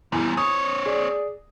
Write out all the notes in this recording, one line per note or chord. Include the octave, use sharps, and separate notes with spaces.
E2 A#2 G3
C4 C#5 D#6
G#4 D5